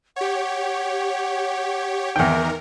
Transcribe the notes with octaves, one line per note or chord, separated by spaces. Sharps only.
G4 C#5 F#5
E2 D#3 A#4 G5